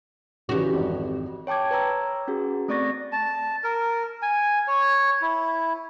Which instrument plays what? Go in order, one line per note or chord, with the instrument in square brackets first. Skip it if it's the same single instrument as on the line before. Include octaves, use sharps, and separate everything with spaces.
[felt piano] C#3 E3 [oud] F#4 G4
[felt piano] G#1 F2
[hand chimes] C#5 G5 A5 D6 G#6
B4 C#5 A#5 E6
C#4 F#4 G#4
A3 C4 D5 C#6 A6 A#6
[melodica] A5
A#4
G#5
C#5
E4